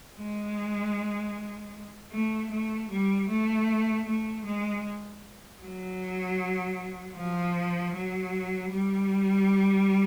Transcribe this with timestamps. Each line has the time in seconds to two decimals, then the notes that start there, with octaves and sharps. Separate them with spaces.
0.18 G#3
2.12 A3
2.50 A3
2.89 G3
3.28 A3
4.06 A3
4.44 G#3
5.61 F#3
7.15 F3
7.93 F#3
8.71 G3